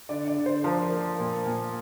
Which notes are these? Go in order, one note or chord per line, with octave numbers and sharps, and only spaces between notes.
D3 D5
D5
D3
C5
F3 A#4
A#3
A#2
A#2